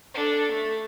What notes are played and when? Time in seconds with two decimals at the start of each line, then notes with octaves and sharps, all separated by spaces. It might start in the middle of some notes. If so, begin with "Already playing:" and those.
0.14 D4 A4
0.51 A3